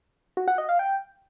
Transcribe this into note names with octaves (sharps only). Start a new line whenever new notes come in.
F#4
F#5
D#5
F5
G5